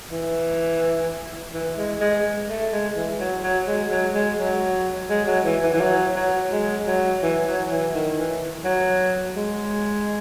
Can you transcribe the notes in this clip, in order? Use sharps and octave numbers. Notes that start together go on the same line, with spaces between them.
E3
E3
G#3
G#3
A3
G#3
E3
F#3
F#3
G#3
F#3
G#3
F#3
G#3
F#3
E3
E3
E3
F#3
F#3
G#3
F#3
E3
F#3
E3
D#3
E3
F#3
G#3